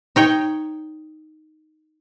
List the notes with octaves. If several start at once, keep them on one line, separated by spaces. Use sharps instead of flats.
D#4 C#5 G5